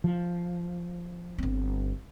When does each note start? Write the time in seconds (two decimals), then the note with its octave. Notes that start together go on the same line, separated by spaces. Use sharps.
0.04 F3
1.38 G1 C4